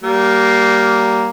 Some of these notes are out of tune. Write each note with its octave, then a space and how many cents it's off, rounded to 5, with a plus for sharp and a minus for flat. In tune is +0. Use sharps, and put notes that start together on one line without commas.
G3 -20 A#3 +0